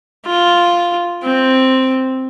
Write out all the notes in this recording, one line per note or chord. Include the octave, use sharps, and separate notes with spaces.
F4
C4